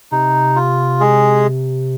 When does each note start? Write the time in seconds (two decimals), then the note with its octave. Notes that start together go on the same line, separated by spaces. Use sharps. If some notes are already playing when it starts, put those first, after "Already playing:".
0.12 C3 D#4
0.56 F4
1.00 G#3 G#4